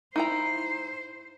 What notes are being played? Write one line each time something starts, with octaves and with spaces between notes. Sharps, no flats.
D#4 E4 C5 A#5